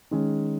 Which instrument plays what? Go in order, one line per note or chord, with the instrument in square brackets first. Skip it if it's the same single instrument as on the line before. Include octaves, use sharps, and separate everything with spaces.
[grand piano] D#3 G#3 C#4